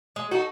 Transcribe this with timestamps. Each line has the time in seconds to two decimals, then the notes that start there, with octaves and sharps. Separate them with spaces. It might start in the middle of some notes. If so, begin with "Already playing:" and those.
0.16 G#3
0.31 D#4 F#4 A4